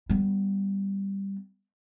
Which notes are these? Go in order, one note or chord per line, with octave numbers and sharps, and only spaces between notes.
G3 B3